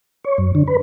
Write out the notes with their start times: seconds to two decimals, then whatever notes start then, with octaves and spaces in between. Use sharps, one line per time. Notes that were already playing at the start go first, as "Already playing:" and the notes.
0.24 C#5
0.38 F#2
0.55 D3
0.67 B4